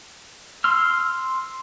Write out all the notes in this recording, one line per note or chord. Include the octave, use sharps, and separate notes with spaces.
C6 E6 F6